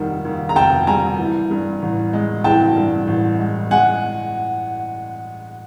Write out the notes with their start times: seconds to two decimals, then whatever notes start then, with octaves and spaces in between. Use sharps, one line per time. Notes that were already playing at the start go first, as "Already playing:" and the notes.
Already playing: F1 D#2 D#3 G3 F#5
0.25 D#2
0.49 A#5
0.55 F1 G5 A5
0.87 G3 G#5 A#5
1.19 E3
1.51 G2
1.82 A1
2.13 G#3
2.44 E3 G5 A5
2.76 G2
3.07 A1
3.39 G#3
3.71 G#3 F#5 G#5